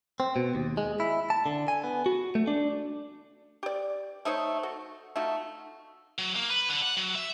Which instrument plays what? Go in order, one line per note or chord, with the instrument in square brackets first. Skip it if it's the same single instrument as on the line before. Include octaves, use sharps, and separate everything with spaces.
[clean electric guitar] C4
B2
D#2
G#3
E4
A5
D3
G#5
B3
F#4
A3
D4
[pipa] G4 D5
A3 D#4 C5 C#5
F#4 A4
A3 D#4 F4 F#4
[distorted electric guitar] F#3
A#3
B4
D3
F#5
F#3
E5